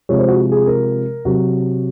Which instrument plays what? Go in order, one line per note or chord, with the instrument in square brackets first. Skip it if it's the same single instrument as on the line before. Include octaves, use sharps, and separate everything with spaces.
[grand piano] C3 F3 G#3 C#5
C5
F#4
G#4
A#4
C3 F#3 F#4